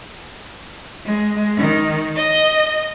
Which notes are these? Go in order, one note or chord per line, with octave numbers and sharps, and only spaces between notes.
G#3
D#3
D#5